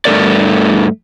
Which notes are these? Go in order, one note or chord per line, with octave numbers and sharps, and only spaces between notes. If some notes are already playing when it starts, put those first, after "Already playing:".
G2 A3 A#4 D5